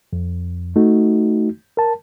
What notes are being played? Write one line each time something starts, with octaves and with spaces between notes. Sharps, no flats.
F2
A3 D#4 F#4
A#4 A5